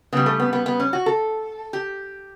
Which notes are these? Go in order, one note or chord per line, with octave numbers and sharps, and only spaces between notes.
C#3 G3 B3
A3
B3
B3
B3
C#4
F#4
A4
G4